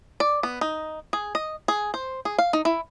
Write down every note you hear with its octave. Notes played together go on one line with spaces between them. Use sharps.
D5
B3
D#4
G#4
D#5
G#4
C5
G#4
F5
D#4
E4